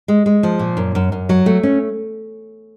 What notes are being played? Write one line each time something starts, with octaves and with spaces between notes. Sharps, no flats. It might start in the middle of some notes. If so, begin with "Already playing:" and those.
G#3
G#3
F3
A#2
F#2
F#2
F#2
F#3
A3
C#4